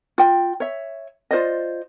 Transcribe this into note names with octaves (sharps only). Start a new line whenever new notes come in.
F4 G5
C#5 E5
F4 C5 D5 D#5